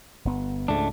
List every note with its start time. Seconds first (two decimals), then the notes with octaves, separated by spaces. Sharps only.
0.25 G1 B3
0.68 C#2 G#2 A3 D4